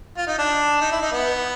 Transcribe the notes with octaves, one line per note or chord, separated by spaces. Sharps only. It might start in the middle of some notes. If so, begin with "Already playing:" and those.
F4
D#4
D4
D#4
E4
D#4
B3